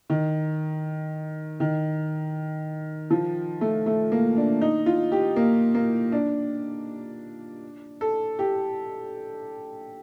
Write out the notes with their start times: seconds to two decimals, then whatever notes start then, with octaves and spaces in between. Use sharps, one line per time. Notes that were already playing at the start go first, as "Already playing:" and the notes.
0.10 D#3
1.60 D#3
3.10 F3
3.61 A3
3.86 A3
4.12 A#3
4.37 D4
4.61 D#4
4.86 F4
5.12 G4
5.36 A#3
5.74 A#3
6.12 D4
8.01 A4
8.39 G4